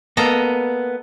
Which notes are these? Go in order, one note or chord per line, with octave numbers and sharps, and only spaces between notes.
A#3 B3 A4 D#5 A#5